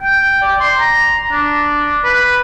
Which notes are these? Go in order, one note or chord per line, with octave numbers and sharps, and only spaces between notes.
G5
D5
C6
A#5
D4
B4